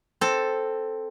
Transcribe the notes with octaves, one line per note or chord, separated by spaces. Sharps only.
C4 A4